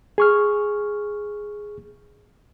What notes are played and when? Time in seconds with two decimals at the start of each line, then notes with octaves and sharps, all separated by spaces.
0.18 G#4 C#6 F6